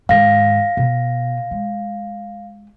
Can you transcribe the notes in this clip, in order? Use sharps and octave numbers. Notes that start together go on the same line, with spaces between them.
G#2 D#3 F5 A#6
B2
G#3